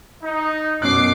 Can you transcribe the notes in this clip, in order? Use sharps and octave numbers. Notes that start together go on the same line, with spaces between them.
D#4
F#2 B2 C#4 D6 F#6 C7